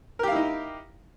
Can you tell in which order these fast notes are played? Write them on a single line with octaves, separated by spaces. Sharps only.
A#4 G4 F5 E4 D#4